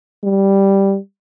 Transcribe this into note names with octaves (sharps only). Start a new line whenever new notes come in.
G3